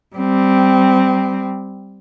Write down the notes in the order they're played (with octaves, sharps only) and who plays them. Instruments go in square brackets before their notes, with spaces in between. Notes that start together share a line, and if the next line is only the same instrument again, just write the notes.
[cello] G3 C4